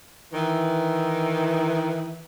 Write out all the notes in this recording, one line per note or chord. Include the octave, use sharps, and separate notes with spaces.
D#3 E3